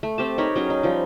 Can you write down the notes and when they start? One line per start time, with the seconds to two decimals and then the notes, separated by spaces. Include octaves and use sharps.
0.03 A3
0.18 C4 G4 A5
0.38 D#4 A#4 C#5 B5
0.55 F#3 C#4 G#4
0.70 D#4
0.83 F3 G3